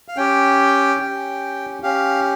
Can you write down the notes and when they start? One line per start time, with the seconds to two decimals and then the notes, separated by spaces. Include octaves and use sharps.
0.08 F5
0.17 C#4 G4 G5
1.00 C#4 G4
1.83 C#4 G4 F5